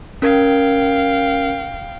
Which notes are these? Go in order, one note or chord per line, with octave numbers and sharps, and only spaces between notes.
C#4 A#4 F5 G5 G#6